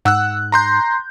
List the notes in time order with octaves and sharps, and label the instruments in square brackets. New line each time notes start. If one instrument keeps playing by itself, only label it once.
[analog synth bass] G#2 [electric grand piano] F#5 E6 F#6
[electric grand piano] A#5 C6 G6